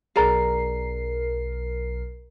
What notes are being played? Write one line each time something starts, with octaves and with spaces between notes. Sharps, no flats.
B1 G#4 A#4 D5 A#5 C7